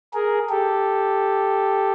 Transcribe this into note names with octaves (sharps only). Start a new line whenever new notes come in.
G#4 A#4
G4 A4